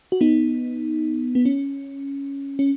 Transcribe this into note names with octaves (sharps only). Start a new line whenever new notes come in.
F#4
B3 D#4
B3
C#4
C#4